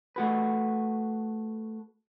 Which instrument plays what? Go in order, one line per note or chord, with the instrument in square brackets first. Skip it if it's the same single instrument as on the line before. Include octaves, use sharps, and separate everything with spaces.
[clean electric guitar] A3 F#4 B4